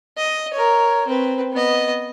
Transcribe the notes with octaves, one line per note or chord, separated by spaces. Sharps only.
D#5
A#4 C#5
C4 B4
B3 D#5